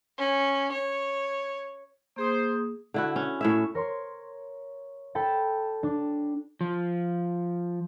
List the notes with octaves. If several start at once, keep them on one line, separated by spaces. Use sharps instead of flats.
C#4
C#5
A#3 G#4 C5 D#6
D3 E4 F#4
C#4
A2 C#5 E5
A#4 C#5 C6
A4 G5 A5 B5
D4
F3